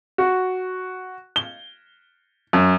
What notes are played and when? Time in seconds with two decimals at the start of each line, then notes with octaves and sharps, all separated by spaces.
0.18 F#4
1.36 G7
2.53 F#2